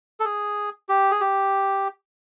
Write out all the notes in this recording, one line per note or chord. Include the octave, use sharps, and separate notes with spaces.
A4
G#4
G4
G#4
G4